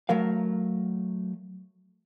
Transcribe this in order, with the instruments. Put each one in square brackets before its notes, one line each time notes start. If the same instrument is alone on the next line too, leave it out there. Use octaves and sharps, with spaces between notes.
[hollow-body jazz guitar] F#3 A3 A#4 F5